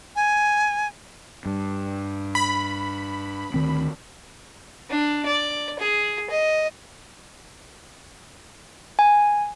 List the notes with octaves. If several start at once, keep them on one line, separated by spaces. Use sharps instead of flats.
G#5
G2
B5
D2 D#3 C4
D4
D5
G#4
D#5
G#5